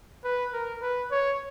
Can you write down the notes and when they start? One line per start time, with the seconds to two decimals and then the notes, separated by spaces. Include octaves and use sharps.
0.24 B4
0.53 A#4
0.82 B4
1.11 C#5